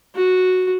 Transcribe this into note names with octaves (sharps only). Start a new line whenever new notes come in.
F#4